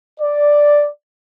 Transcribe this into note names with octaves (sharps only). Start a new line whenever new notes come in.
D5